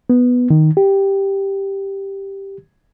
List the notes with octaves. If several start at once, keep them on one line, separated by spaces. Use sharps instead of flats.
B3
D#3
G4